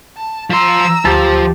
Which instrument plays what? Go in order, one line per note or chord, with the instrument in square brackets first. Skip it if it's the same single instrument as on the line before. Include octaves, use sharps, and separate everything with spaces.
[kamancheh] A5
[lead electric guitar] F3 C6 [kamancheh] A#5 E6
[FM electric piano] D2 [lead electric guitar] F3 [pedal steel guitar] G4 A5